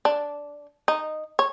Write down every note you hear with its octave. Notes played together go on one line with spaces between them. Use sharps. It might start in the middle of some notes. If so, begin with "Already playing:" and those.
D4
D#4
C#5